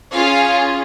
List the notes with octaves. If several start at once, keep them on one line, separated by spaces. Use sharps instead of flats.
C#4 F4 G#4 F5